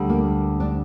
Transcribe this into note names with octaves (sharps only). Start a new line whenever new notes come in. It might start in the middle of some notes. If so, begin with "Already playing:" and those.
Already playing: D2 D3 G3
A#3
D4